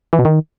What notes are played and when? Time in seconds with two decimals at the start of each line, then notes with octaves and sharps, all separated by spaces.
0.13 E3
0.19 B2
0.25 D#3